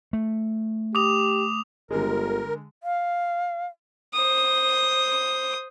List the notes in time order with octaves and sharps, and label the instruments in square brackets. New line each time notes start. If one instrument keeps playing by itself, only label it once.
[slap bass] A3
[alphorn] G4 [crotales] D6 D#6 F7
[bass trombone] G1 [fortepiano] D3 G#3 [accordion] A#4
[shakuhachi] F5
[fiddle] C5 D#6